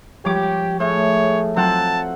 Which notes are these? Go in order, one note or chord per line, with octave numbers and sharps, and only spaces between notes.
F3 G3 G#3 G4 C#5 D6
A2 G#4 C#5
F#3 C4 F4 F#5 A5